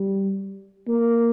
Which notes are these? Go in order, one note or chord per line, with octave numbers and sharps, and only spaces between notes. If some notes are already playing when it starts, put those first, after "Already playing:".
Already playing: G3
A#3